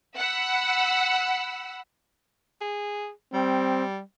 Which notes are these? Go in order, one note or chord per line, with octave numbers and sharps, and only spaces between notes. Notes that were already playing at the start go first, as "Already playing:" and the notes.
F#5 B5 E6
G#4
G3 C4